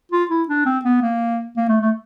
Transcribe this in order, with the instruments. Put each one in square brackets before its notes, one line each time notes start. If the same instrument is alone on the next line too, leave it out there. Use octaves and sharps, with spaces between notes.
[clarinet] F4
E4
D4
C4
B3
A#3
A#3
A3
A3